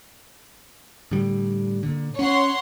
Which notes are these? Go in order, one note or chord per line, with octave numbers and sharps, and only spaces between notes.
A2 D3 G3
A#2 D3
C#4 C#5 F#5 C6